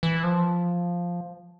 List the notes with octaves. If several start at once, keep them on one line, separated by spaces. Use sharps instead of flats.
E3
F3